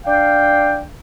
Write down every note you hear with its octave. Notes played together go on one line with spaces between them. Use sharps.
D4 F5 G5